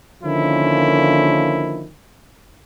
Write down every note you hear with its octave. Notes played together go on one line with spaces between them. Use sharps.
D3 D#3 F3 A#3 C#4 E4